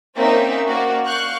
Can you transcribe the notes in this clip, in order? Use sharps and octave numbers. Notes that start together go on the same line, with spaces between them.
A#3 C4 C#4 D#4 E5 G5
A#3 F#4 D5
F5 C#6 F#6 G6